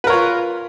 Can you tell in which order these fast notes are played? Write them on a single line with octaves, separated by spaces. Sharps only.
B4 A#4 C#5 F4